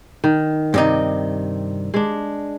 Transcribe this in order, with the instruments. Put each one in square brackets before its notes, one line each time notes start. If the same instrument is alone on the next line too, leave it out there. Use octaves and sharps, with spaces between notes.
[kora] D#3
[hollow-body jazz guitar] G2 C3 D#4
[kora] G#3 D4